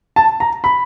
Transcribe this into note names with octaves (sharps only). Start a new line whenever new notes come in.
A5
A#5
B5